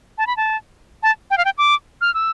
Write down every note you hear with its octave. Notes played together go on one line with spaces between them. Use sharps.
A5
B5
A5
A5
G5
F5
G5
D6
F6
E6